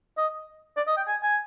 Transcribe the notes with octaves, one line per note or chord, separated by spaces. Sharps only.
D#5
D5
D#5
G5
G#5
G#5